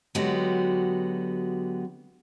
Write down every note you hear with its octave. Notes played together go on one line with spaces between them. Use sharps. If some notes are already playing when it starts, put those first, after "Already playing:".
D3 F#3 G#3 B3 F#4 G4